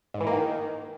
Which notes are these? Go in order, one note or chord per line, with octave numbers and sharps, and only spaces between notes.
G#2
E3
A#3
D#3